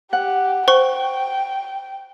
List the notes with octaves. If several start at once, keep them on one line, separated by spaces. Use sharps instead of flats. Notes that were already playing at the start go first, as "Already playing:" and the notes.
G4 F#5
C5 G5 C#6